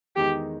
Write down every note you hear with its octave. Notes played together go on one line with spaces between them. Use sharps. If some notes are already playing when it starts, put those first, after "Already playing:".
E2 D#3 G#3 D#4 G4